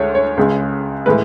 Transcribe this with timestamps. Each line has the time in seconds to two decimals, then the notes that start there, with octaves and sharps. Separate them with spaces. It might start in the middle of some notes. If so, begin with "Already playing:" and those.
Already playing: D2 G#3 C#5
0.15 C#5
0.37 C#2 C#3 G#3
1.06 A2 E3 G#3 B4